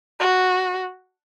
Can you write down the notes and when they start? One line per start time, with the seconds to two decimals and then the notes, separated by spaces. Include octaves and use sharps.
0.20 F#4